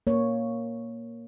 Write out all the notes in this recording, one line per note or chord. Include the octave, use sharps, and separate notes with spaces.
A#3 C#5